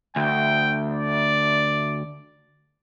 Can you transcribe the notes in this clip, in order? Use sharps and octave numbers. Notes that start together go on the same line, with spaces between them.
D2 G5
D5